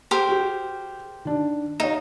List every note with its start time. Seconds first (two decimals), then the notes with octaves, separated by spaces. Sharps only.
0.11 G4 A#4 C5
0.29 F#4 G#4
1.25 D#3 D4
1.80 D#4 C#5 F5